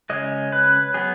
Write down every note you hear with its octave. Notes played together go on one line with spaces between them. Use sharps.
C#3 G#3 C#4 D#5
B4
F#3 B3 G#4